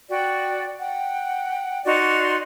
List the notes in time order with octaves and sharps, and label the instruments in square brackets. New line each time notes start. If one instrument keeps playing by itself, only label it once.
[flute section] F#4 D5 G5
F#5 G5
D#4 F#4 D5 C6